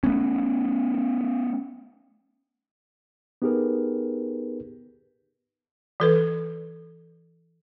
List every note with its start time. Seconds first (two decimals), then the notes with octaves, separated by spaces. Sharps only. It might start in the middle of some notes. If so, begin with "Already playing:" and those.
0.03 A3 B3 C#4
3.42 B3 D#4 G4 G#4 A#4 B4
6.00 E3 A4 B4